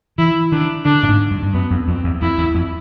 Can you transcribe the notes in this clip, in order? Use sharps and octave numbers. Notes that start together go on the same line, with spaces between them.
E3 E4
D#3 D4
D3 D4
A2
G#2
G2
G2
F#2 B3
F2
F2 C4
E2
F2 E4
E2
F2